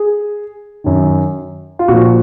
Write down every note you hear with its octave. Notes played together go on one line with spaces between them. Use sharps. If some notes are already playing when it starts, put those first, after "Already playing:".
Already playing: G#4
F#2 D#3
F4
A#2 F3 F#4